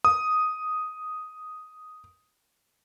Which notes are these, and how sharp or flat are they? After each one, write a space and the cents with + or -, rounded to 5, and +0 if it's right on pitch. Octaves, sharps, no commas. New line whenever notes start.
D#6 +0